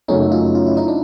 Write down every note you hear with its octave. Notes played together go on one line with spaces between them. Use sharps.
F#2 C#3 F#3 A3 C#4 D#4
D#4 F4
F4
E4
D#4
D4